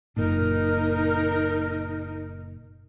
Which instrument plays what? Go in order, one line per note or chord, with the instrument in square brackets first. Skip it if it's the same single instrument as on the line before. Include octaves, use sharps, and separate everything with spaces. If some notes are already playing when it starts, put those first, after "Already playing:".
[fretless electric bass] F#1 A#2 [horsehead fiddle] D#4 A#4